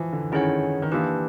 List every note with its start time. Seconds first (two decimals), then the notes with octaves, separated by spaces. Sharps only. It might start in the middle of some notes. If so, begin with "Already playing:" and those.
Already playing: E3 F3
0.13 D3
0.32 D#3 C#4 E4 G#4 C#5 F#5
0.82 D#3
0.92 E3 A#3 D4 G4 B4